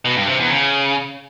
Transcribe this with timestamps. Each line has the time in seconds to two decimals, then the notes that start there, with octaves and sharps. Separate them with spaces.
0.05 B2
0.16 G2
0.28 C3
0.39 E2
0.50 C#3